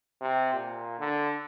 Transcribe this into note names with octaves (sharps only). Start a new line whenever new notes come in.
C3
A#2
D3